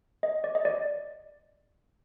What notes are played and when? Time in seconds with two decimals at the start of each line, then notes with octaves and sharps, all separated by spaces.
0.23 D#5
0.44 D5
0.55 D#5
0.65 D5